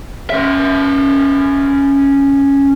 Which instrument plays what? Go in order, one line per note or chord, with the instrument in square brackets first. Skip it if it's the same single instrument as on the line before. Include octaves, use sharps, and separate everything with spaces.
[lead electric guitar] C#4 E5